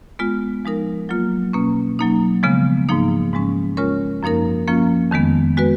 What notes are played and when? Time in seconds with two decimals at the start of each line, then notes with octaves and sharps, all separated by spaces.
0.19 G#3 B3 F4
0.65 F3 G#3 D#4 A#4
1.09 F#3 A#3 F4
1.53 B2 A#3 C#4
1.99 F#3 A#3 D#4
2.43 C#3 F3 G#3 B3
2.89 G#2 F3 A#3 D#4
3.33 G#2 F3 G#3 C#4
3.77 G#3 C#4 F4 A#4 C#5
4.23 F#2 F3 A#3 D#4 A#4
4.68 F3 A#3 C#4 F4
5.11 F2 D#3 G#3 B3
5.57 G#3 B3 F#4 B4